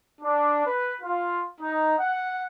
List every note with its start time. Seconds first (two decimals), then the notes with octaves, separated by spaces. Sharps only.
0.22 D4
0.66 B4
1.01 F4
1.59 D#4
1.98 F#5